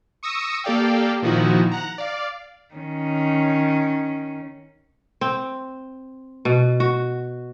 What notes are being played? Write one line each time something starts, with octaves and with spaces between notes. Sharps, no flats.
C#6 D#6 E6 A#6 C#7
A#3 G4 A4 D5 F5 G5
A#2 D#3 F3 D#4 E4 F#4
F#5 A#5
D5 F5
D#3 C#4
C4
B2
F#4